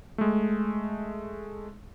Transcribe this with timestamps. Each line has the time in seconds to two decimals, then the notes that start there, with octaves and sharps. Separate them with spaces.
0.18 G#3 A3